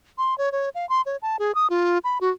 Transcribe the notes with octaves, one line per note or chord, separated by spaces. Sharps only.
C6
C#5
C#5
F5
C6
C#5
A5
G#4
D#6
F4
B5
F#4